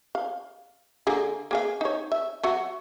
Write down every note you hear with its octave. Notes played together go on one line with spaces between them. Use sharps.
F5
D3 A#3 G#4
A#3 G#4 F5
D#4 C#5
E5
F#3 F#4 E5